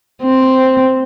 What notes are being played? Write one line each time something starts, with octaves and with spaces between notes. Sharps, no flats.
C4